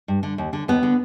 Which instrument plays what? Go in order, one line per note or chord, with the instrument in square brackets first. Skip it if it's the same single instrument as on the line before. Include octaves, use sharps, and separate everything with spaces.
[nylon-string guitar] G2
D3
D#2
D3
D#2 B3
D3